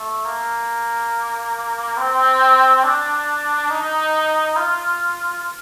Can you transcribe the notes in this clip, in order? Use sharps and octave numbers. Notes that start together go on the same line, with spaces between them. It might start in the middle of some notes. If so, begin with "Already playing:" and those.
Already playing: A3
A#3
C4
D4
D#4
F4